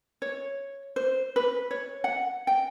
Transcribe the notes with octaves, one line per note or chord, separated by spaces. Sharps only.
C#5
C5
B4
C#5
F#5
G5